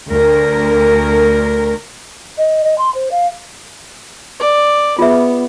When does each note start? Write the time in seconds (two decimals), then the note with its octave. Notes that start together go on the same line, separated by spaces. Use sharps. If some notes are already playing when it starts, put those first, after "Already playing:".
0.11 D2 A#4
2.38 D#5
2.64 D#5
2.78 C6
2.95 C5
3.11 F5
4.40 D5
4.99 B3 F4 G#4 E5